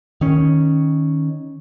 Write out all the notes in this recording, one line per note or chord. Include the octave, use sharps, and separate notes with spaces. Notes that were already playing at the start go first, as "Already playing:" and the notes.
D#3 C#4